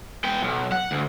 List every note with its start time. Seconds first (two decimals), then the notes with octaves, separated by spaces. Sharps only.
0.24 B3 G5
0.42 B1
0.72 F#5
0.91 D2